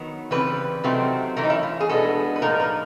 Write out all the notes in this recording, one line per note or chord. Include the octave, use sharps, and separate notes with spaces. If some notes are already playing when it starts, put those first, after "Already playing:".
Already playing: D#3 F#3 B3
C#3 E3 G3 C4 B4
C3 D#3 F#3 A3 C4
E3 A3 C#4 A#4
D#4
E4
F4
G#4
B2 G#3 B3 D4 A4
B4
A2 F3 A#3 D#4 A#4
B4